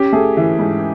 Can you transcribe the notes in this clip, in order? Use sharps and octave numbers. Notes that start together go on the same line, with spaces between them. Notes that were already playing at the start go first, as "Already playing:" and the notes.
Already playing: C#4 G4
A3 G#4
E3
G#2